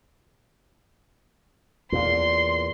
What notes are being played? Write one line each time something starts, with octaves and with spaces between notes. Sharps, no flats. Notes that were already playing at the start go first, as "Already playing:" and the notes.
E2 A#2 C6